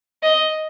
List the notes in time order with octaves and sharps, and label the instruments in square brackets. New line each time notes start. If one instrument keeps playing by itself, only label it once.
[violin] D#5